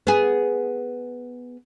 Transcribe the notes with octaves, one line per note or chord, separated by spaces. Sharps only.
B3 G#4